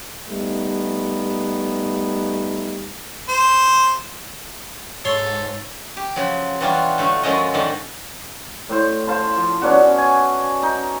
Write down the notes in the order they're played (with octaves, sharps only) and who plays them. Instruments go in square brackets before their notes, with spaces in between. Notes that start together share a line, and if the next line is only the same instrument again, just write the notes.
[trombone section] G3 A3 B3 D#4
[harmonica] C5
[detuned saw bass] G#2 [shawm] A4 [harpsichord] C#5 C6
[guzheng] G4
C#3 F3 F#3
E3 F#3 G3 D4 F4 F#4
A2 D3 A3
F#2 F3 F#3 G#3 C#4 D#5
G#2 D3 D#3 D#5 A5
[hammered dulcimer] A2 C5
C5 F5 A5 C6
F3
B3 C#4 D4 F#4
G#5
D#4